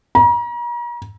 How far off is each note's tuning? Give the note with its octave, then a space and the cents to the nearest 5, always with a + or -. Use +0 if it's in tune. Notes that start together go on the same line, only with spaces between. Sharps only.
A#5 +40